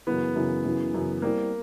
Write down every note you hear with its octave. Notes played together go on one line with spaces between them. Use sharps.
F#2 C#3 E3 B3
F#2 C#3 E3
F#2 C#3 E3
F#2 C#3 E3
G3 A#3 C4 E4